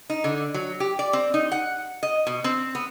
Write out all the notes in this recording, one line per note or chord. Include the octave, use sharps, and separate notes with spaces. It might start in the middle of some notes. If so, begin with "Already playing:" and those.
D#4
D3
F#3
G4
D5
C4
D#4
F#5
D#5
B2
C4
B3